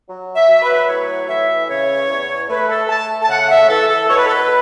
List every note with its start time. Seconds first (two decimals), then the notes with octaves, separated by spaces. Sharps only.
0.09 F#3
0.36 E5
0.49 F#3
0.62 B4
0.88 A2 C#5
1.28 E3 E5
1.68 C#3 C#5
2.09 E2
2.49 A3 B4
2.69 A4
2.89 A3 A5
3.22 A5
3.29 C#3 F#5
3.50 E5
3.69 E3 A4
3.89 A4
4.10 B2 C#5
4.17 B4
4.26 A4
4.35 B4